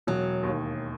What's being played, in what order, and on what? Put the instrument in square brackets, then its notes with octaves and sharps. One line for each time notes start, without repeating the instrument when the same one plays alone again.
[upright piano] E1 [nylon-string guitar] F#3
[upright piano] D#2 D#3